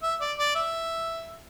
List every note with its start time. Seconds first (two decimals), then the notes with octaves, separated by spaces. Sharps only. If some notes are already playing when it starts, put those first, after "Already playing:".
0.03 E5
0.21 D5
0.39 D5
0.55 E5